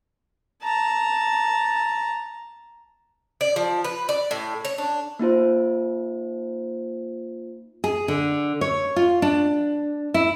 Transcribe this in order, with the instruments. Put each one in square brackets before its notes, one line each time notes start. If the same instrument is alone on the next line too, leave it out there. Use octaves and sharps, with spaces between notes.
[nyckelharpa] A5 A#5
[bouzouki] D5
F3
B4
D5
A2
C#5
D4
[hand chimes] A#3 D#4 F4 C5
[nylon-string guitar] G#4
D3
C#5
F4
D4
E4